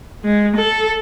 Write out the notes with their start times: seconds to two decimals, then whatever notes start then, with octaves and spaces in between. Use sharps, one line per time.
0.25 G#3
0.56 A4